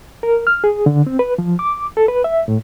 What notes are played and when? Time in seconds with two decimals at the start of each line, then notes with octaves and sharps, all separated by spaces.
0.23 A#4
0.47 F6
0.64 G#4
0.86 D3
1.07 C4
1.19 B4
1.38 F3
1.59 D6
1.97 A4
2.08 B4
2.24 E5
2.48 A2